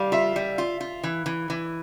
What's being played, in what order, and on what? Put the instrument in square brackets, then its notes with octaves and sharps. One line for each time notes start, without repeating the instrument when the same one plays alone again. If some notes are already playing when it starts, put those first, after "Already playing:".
Already playing: [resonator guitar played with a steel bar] G3 [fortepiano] F5
[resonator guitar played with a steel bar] F4 [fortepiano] E5
[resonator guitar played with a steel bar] G3
F4
F4
E3
E3
E3